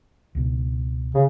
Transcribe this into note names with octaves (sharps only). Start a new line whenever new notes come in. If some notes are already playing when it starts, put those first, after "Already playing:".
C#2 B2
C#3